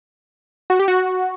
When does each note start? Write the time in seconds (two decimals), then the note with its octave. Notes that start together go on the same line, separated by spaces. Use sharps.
0.70 F#4
0.79 G4
0.88 F#4